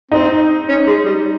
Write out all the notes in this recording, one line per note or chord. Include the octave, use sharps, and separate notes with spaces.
C4 D#4
C#4
G#3
G3